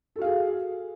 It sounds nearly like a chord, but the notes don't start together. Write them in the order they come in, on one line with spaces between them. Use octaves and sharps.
A4 F#4 F5 G#4